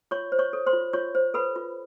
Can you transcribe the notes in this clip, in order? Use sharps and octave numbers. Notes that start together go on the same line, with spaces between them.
F4 C#5 C#6
C5
C#5 C#6
A4
C5 C6
F4
F4 C#5 C#6
C5
A4 B4 B5
F4